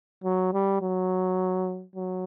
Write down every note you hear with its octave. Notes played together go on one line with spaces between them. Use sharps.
F#3
G3
F#3
F#3